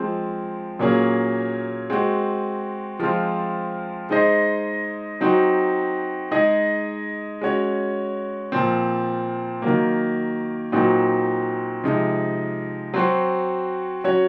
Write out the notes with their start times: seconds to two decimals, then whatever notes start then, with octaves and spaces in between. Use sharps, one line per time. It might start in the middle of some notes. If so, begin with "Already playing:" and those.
Already playing: F3 G#3 C4
0.79 A#2 F#3 A#3 C#4 G#4
1.90 G#3 C4 F#4
2.99 F3 G#3 C4 F4
4.10 G#3 D#4 G#4 C5 D#5
5.21 F#3 C4 D#4 F#4
6.31 G#3 D#4 G#4 D#5
7.41 G#3 C#4 F#4 C#5
8.52 A#2 F3 C4
9.62 D#3 F#3 A#3
10.72 A#2 F#3 C4 D#4 F#4
11.84 C3 F3 G#3 D#4
12.94 F#3 C4 F#4 C5
14.04 F#3 C#4 F#4 C#5